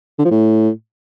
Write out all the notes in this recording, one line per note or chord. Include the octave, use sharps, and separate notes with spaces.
D3
F3
A2